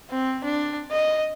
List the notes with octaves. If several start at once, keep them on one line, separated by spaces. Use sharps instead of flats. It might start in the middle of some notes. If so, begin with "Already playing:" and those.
C4
D4
D#5